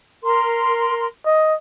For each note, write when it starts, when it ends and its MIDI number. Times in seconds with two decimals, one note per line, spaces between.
0.24 1.07 70
0.24 1.07 84
1.26 1.55 75